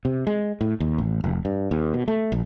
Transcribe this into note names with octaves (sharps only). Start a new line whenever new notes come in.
C3
G#3
A2
D#2
A1
F1
G2
D#2
B2
A3
A#1